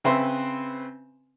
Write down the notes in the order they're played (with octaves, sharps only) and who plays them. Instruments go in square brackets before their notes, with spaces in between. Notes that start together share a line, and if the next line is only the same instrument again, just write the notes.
[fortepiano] C#3 C4 B4 E5 C6